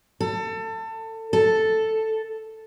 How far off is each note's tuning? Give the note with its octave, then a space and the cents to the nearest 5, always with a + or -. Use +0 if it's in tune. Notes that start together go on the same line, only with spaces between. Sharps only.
A4 +25
A4 +0